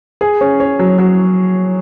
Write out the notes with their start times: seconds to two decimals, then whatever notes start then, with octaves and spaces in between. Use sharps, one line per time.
0.21 G#4
0.41 C#4
0.60 C#5
0.79 F#3
0.98 F#3